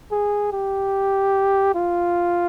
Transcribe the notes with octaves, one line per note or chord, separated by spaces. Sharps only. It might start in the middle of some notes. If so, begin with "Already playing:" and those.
G#4
G4
F4